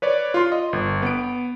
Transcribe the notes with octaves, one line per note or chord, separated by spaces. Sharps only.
B4 C#5 D5
F4 C6
D#5
G1
B3 D7